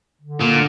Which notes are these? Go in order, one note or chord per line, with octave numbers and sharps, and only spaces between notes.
D3
A#2
D4